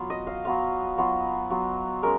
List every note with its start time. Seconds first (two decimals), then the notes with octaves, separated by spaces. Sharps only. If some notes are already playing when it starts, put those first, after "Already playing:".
Already playing: F#3 B3 F4
0.10 D#5
0.27 F5
0.45 F#3 B3 F4 F5
0.98 F#3 B3 F4
1.50 F#3 B3 F4
2.03 G#3 C#4 A#4